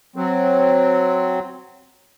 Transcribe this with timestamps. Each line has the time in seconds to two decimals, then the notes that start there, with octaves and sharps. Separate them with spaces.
0.16 F#3 C4